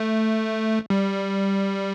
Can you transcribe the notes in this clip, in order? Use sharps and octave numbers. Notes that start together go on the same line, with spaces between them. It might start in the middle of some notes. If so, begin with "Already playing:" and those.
Already playing: A3
G3